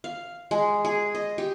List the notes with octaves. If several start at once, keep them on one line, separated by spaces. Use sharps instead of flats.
F5
G#3
G#4
D#5
G4